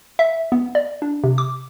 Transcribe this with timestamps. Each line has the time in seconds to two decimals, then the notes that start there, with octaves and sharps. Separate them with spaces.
0.19 E5
0.52 B3
0.75 D5
1.02 D4
1.24 C3
1.38 D6